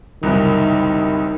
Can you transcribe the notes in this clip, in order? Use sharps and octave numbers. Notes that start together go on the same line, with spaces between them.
F#1 C2 D#3